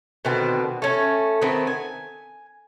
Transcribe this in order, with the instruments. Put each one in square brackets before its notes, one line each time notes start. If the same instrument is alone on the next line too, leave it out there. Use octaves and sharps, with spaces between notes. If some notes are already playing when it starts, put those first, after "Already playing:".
[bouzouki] B2 D3 D#3 C4
A3 C#4
D#3 A3 B3 C4
G#5